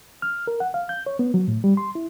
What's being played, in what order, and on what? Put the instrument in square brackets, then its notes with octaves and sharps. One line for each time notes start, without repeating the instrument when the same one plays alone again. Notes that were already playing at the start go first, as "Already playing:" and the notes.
[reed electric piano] F6
A#4
F#5
F5
G6
C#5
B3
F#3
A2
G3
C6
E4